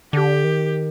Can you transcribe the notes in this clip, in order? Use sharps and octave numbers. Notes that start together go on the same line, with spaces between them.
D3 G4
D#3